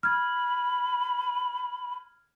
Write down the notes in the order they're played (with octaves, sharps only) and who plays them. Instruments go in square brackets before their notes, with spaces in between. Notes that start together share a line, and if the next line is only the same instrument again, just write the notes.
[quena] B5 [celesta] F6 G#6